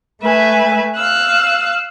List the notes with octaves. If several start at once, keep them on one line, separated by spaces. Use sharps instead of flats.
A3 B4 E5 G#5
F5 E6 F#6